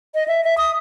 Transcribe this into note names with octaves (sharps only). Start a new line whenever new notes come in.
D#5
E5
E5
D#6